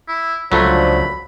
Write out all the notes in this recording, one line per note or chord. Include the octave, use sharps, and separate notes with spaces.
E4
C#2 D3 F3 F#3 A3 B5